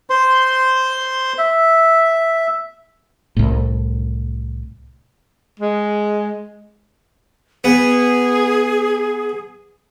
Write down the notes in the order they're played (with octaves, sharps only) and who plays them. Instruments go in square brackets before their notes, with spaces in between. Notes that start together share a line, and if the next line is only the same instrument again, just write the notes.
[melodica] C5 C6
E5
[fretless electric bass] C2 A2
[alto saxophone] G#3
[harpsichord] B3 [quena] G#4